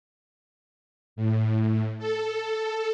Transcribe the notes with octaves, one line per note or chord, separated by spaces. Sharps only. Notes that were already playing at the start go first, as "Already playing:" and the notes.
A2
A4